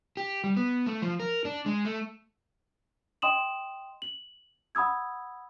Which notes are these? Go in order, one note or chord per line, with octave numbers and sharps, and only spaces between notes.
G4
G3
B3
A3
F3
A#4
D4
G#3
A3
D#5 G5 C6 D#6 E7 F#7
F#7
F#5 B5 D#6 E6 G#6